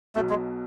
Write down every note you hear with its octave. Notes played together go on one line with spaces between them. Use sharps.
B1 B2 F#3 A3
G#3